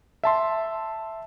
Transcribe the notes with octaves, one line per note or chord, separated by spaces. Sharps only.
E5 A5 C6